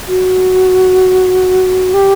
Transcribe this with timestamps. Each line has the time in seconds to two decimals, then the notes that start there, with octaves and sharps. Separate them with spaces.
0.08 F#4
1.94 G4